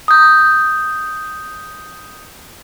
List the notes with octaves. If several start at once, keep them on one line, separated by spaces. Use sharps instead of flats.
D#6 G6